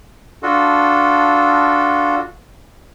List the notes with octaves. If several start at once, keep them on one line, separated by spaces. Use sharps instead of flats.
D4 F4 F#4 A4